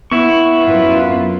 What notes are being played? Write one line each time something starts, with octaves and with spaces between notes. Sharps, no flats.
B3 E4 C#6
F#2 F4 B4